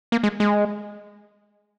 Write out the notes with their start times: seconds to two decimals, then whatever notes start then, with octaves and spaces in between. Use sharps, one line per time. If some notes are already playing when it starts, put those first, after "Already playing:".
0.12 A#3
0.23 G#3
0.40 G#3